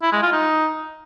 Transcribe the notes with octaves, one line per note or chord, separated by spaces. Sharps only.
E4
G#3
F4
D#4